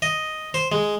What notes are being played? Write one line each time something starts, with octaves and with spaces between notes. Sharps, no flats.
D#5
C5
G#3